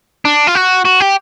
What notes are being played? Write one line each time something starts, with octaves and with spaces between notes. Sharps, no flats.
D4
F4
F#4
F#4
G4